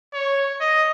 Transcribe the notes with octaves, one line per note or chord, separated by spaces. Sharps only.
C#5
D#5